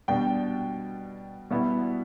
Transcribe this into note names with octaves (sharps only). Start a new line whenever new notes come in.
B2 G3 D4 G5
B2 G3 B3 E4